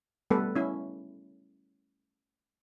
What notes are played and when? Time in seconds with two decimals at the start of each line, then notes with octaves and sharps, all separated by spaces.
0.30 G3 A3 B3 A4 B4
0.55 C#4 E4